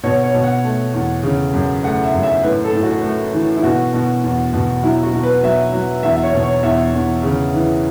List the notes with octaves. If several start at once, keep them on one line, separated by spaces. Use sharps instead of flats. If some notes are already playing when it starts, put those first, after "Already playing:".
B2 C#5
C#5
B2
F#5
A3
E2
C#3
F#2
A3 F#5
E5
F#2
E5
A2 B4
A4
A2
F#4
A3
E3
E4
B2 F#4
B2
E2
B2
F#3 E4
F#4
B2
B4
F#3 E5
F#3
E2 E5
E5
C#5
B2
C#5
E2 E5
E2
C#3
E3